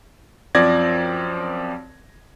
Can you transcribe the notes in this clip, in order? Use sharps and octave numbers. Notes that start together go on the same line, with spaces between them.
F#2 F3 C4 D5 G#6 A#6